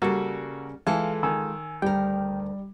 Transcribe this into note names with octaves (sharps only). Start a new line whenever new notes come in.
C#3 G3 A#3 F#4 A4
E3 G#3 F4 A4 F5
D#3 G#5 E6
D2 G3 A#4 G5